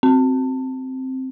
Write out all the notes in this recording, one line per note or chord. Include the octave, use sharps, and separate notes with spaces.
C4